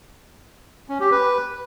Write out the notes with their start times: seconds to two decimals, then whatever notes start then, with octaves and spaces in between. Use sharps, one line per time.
0.89 C#4
1.00 G4
1.12 B4